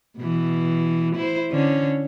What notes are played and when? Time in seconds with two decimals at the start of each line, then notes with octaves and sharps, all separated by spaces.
0.18 B2 E3
1.15 E4 C5
1.51 D3 C#4